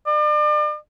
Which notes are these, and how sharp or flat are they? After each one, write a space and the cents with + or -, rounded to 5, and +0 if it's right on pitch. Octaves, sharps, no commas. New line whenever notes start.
D5 +40